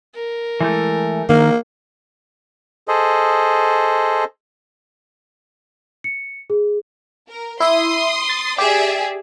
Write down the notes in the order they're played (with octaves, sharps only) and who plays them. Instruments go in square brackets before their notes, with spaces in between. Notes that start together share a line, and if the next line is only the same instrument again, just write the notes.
[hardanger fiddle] A#4
[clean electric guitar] E3 G#3 A3
[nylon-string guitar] D#3 [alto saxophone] A#3
[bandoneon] G#4 A4 C5 D#5
[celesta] C#7
G#4
[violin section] A#4
[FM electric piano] E4 E5 [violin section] C6 D#6
[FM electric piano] A6
[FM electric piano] G4 [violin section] G#4 D5 E5